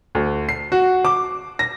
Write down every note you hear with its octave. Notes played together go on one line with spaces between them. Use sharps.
D2
C7
F#4
D6
A#6